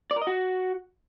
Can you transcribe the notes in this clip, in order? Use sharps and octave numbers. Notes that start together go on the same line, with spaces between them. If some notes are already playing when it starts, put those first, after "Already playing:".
D5
A#4
D#5
F#4